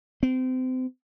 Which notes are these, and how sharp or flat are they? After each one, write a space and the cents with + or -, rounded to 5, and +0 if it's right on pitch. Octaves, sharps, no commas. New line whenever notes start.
C4 -30